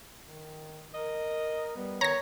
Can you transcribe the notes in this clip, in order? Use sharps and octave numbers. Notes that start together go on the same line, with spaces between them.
D#3
A#4 D#5
G3 B3
D#3 C#5 A#5 A#6